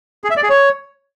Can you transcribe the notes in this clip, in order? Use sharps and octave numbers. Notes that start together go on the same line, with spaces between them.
G#4
E5
D5
G#4
C#5